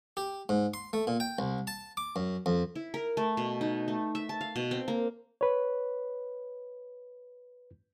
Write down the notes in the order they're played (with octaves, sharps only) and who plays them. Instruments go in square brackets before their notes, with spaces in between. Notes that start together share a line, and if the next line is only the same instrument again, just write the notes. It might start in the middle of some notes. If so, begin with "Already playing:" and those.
[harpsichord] G4
G#2
C6
A3
A#2
G5
C2
A5
D6
F#2
F2
[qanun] E4
A#4
A3
B2
D#4
A3
E5
A5
F5
B2
C4
A#3
[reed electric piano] B4 C#5